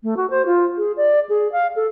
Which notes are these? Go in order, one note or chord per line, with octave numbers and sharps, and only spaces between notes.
A3
F#4
C5
F4
G#4
D5
G#4
F5
A4